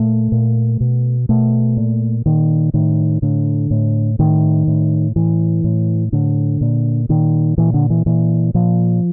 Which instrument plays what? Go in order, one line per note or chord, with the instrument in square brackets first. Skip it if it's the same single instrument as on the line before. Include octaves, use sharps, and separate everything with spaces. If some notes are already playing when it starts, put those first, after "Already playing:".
Already playing: [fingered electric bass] A#2 A3
A#2
B2
B2 A3
A#2
A#2 D#3
A2 D#3
A2 D3
A2
A2 D#3
A2
A2 E3
A2
A2 D3
A#2
A#2 D#3
A#2 E3
D3
E3
A#2 E3
A#2 F3